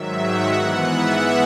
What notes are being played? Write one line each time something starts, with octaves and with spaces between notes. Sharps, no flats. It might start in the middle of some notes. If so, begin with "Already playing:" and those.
Already playing: G#2 D#3 F#3 E5
F#5
G#2 E3 B3 F#5
E5